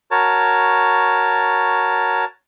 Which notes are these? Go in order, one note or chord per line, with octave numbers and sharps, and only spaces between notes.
F#4 A#4 C#5 A5